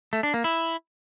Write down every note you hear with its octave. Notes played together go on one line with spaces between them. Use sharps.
A3
D4
A#3
E4